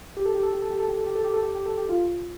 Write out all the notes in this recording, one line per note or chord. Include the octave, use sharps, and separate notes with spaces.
G4
A4
G4
A4
G4
A4
G4
A4
G4
A4
G4
A4
G4
A4
G4
G4
A4
G4
F4